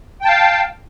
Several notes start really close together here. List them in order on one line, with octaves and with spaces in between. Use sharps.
G5 A5 F5